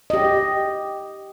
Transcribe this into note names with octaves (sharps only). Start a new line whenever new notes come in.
G4 D#5